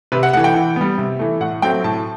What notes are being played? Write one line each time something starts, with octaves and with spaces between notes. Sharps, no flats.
C3 B4
F#5
E3 A3 F#5
G5
E3
G3 B3
C3
E3 A3
A2 F#5
F#3 A3 C4 G5
A2 A5